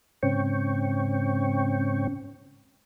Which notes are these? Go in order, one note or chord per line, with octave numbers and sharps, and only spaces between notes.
G#2 C#3 C4 C#4 G5 C#6